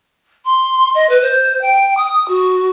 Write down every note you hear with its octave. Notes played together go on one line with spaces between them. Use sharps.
C6
D#5
B4
C5
G5
D#6
F#4